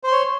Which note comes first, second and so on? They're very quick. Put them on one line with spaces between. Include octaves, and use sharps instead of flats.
C5 C6 C#5